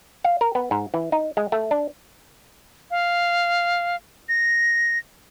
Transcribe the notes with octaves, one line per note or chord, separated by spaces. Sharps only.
F5
A#4
B3
G#2
E3
D#4
G#3
A3
D4
F5
A#6